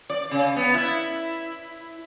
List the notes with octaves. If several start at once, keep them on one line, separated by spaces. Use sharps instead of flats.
D5
C#3
B3
E4